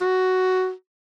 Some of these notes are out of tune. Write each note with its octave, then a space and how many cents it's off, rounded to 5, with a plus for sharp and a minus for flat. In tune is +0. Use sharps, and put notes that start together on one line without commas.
F#4 +10